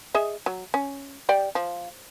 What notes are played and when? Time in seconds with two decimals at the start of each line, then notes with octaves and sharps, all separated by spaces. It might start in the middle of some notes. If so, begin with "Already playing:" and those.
0.14 G#4 D#5 E5
0.46 F#3
0.74 C#4
1.29 G4 D5 G5
1.55 F3